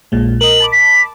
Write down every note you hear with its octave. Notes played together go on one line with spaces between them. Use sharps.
A#1 A#2 G#3
A#4 D#5 F#7
A5 B5 D6
B6